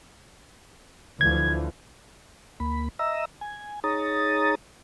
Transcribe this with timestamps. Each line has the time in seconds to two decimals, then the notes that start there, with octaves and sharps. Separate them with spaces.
1.21 D2 E3 F3 G#6
2.60 D2 A#3 B5
2.99 D#5 E5 A#5 E6
3.41 G#5
3.84 D#4 G#4 C#5 A#5 D#6 A6